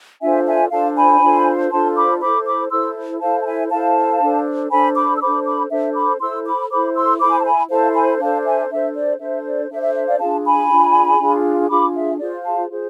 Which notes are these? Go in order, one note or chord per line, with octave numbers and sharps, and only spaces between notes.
D4 F4 A4 C5 E5 G#5
E5 G#5
D4 F4 A4 C5 F5 A5
G#5 B5
D4 F4 A4 C5
D4 F4 A4 C5 A5 C6
B5 D6
E4 A4 C5 B5 D6
B5 D6
E4 A4 C5 C6 E6
E4 A4 C5 F5 A5
A5
E5 G#5
E4 A4 C5 F5 A5
D4 A4 C5
D4 A4 C5 G#5 B5
B5 D6
E6
D4 A4 C5 B5 D6
B5 D6
D4 A4 C5 E5
B5 D6
E4 A4 C5 C6 E6
B5 D6
E4 A4 C5 B5 D6
C6 E6
E4 A4 C5 B5 D6
G#5
A5
G#5 B5
E4 A4 C5 F5 A5
G#5 B5
D4 A4 C5 F5 A5
E5 G#5
D4 A4 C5 E5
D5
D4 A4 C5 E5
D5
D4 A4 C5 E5
E5
E5
D5 F5
D4 F4 G#4 F5 A5
G#5 B5
D4 F4 G#4
D4 F4 G#4
D4 F4 G#4 B5 D6
E5
F4 G#4 C5 D5
F5 A5
F4 G#4 C5